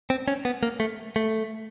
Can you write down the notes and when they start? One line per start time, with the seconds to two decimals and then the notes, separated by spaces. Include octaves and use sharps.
0.10 C4
0.28 C#4
0.45 B3
0.63 A#3
0.80 A3
1.16 A3